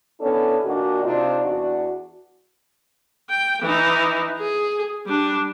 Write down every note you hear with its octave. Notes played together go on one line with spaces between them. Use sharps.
B3 C#4 D4 E4 A4
A#2 D#3 D4 F#4
C3 D4 D#4 F4
E2 D4 F#4
G5
E3 D#4
G#4
G3 D4